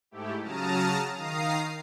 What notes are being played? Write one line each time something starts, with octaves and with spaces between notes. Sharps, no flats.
G#2 A3 E4 G4
C#3 F#3 A5 A#5 D#6 F6
D#3 F5 A#5 D#6 C7